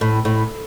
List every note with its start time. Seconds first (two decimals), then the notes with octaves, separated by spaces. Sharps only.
0.01 A2
0.25 A2